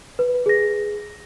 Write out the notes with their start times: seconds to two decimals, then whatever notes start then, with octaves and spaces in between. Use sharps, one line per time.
0.19 B4
0.46 G#4 A#6